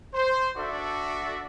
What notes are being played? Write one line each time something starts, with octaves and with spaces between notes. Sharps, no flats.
C5
D4 F#4 A4 D5 E5